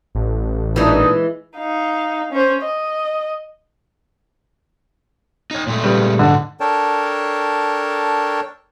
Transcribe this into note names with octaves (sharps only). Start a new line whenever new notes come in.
A1
A#2 E3 G#3 D4 D#4
D#4 F5
C#4 C5
D#5
D#4 C#5
A#2 G#3 A3
C#3 G3 B4
G#2 D3 F#3
D4 A4 A#4 C#5 G5 A5